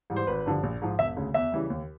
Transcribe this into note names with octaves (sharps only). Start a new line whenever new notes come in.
G#2 E3 G3
C5
G#1 B4
G2 D3 F3
A#1
G#2 F3
E1 E5
D2 C#3
E2 E5
C#3 E3 G3
D#2